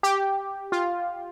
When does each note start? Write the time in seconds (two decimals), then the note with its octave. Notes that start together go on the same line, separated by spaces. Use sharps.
0.03 G4
0.72 F4